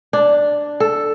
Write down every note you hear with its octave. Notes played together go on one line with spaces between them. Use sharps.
D4
A4